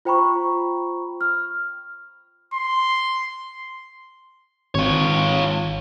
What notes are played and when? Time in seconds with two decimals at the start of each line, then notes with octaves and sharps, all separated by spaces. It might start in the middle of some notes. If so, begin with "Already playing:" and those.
0.05 F4 C5 G5 A#5 B5 C#6
1.21 F6
2.54 C6
4.75 G#1 F4 C#5